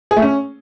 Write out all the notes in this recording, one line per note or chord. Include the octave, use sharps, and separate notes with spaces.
G#4
A3
C#4